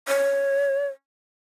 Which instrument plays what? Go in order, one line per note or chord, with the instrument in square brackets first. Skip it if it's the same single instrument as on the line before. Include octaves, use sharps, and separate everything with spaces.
[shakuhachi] C#5